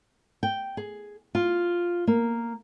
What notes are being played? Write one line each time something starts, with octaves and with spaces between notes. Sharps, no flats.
G5
G#4
F4
A#3